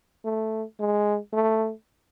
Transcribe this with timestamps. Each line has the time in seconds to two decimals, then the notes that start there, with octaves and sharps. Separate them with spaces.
0.25 A3
0.80 G#3
1.33 A3